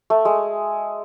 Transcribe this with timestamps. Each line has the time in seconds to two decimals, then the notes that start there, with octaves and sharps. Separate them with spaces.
0.10 A3
0.25 G#3